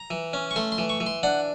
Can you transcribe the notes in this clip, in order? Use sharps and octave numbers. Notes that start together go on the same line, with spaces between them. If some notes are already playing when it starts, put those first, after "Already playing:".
Already playing: A#5
E3
C#4
C#6
A3 C6
C6
E3
C#6
E3
C6
D4 F#5